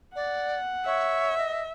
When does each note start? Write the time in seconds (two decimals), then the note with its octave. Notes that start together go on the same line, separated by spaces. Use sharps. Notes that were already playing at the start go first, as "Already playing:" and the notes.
0.15 D5 F#5
0.86 C#5 E5
1.38 D#5